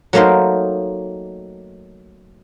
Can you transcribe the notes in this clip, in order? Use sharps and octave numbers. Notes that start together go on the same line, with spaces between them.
F#3 A3 A#3 D#4 A#4 C5